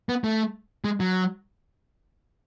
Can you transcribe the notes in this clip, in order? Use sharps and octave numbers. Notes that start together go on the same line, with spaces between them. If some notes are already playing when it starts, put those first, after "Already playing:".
B3
A3
G#3
F#3